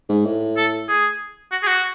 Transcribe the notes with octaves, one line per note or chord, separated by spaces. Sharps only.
G#2
A2
A4
G#4
F#4
G#4
F#4